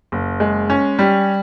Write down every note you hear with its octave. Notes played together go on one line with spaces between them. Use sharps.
F#1
G#3
C#4
G3